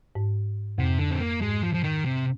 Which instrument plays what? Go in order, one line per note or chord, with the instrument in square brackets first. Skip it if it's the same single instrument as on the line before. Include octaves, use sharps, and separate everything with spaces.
[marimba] G#2
[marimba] F2 [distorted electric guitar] C3
[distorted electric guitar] D3
C4
A#3
[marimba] G#2 [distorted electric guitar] G#3
[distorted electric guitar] F3
F3
D#3
C3